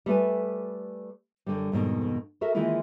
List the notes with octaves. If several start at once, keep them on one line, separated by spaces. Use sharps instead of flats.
G3 A3 B4 G#5
F#2 D3 G3
F2 G#2 B2 D#3
F#4 A4 A#4 E5
D#3 E3 G#3 A#3 E4 F4